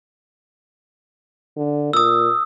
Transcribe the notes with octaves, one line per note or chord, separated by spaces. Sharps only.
D3
A#2 D#6 E6